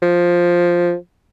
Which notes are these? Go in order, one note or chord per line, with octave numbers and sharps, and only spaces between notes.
F3